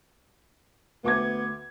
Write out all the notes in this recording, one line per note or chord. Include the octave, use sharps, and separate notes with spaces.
D2 B3 D6 G#6